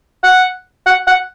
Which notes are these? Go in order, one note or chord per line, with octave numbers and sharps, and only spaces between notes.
F#5
F#5
F#5